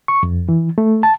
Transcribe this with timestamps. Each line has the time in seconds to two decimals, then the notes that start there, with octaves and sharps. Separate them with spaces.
0.08 C#6
0.23 F2
0.49 E3
0.78 A3
1.03 A5